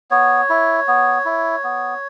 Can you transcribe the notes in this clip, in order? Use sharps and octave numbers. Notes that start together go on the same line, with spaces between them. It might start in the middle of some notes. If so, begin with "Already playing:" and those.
B3 C#5
E4
B3
E4
B3